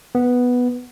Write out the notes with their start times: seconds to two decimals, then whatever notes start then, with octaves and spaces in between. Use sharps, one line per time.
0.15 B3